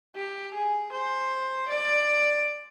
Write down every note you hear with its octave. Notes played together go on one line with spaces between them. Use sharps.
G4
G#4
C5
D5